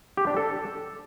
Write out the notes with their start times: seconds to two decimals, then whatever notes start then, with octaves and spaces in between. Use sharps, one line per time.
0.17 G4
0.27 D4
0.37 A4